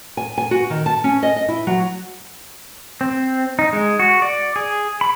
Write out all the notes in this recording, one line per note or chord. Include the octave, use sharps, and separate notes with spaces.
G#5
G#5
F#4
D#3
A5
C#4
D#5
D#5
E4
F#3
C4
D#4
G#3
F#4
D5
G#4
B5